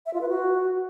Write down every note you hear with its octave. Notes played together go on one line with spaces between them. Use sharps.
E5
F4
B4
F#4